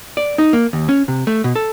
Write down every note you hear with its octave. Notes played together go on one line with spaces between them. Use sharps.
D5
D#4
A#3
D#2
C#4
C3
A3
B2
A4